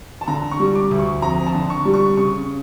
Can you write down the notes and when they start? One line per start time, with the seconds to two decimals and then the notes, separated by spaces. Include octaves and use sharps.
0.21 A5
0.28 D3 A#5
0.51 C#6
0.60 G3
0.75 D6
0.91 D2
0.99 C#6
1.22 F2 A#5
1.46 A5
1.54 D3
1.70 C#6
1.85 G3
1.94 C#6
2.17 C#3 C#6